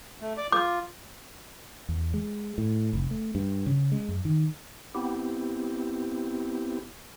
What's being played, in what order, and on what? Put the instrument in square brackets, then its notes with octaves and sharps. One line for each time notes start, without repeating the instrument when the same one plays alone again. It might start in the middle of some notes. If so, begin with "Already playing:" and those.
[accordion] A3
D5 D6
[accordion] F4 [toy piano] D6
[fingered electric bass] E2
G#3
A2
F1
A3
G2
C#3
G#3
F#2
D#3
[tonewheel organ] B3 C4 E4 G4